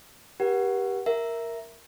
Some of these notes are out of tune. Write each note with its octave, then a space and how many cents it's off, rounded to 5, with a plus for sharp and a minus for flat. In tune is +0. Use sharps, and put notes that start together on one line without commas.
G4 +0 A#4 +45 F#5 +0
A#4 +0 E5 +0